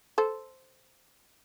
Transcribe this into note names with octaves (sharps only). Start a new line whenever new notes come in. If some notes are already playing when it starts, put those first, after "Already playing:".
A4 C5